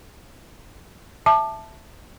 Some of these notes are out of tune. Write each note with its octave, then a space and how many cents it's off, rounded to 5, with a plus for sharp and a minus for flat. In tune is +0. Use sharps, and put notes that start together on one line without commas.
E5 +0 A5 +0 D6 +35